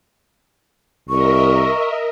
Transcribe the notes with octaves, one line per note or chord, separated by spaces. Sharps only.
C2 A#4 D#5 E5 C#6